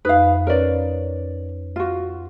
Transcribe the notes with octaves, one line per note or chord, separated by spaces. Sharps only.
F2 D#4 B4 F5 D#6
C#4 A#4 B4 C#5 D5
F4 F#4